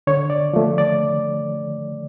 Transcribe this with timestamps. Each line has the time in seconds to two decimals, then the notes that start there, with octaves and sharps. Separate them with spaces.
0.07 D3 C#5
0.30 D5
0.53 F3 A3
0.78 D5